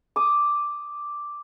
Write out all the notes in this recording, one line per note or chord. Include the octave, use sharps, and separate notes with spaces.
D6 D#6